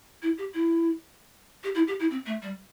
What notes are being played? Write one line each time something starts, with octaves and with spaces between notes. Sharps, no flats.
E4
G4
E4
G4
E4
G4
E4
C4
A3
G3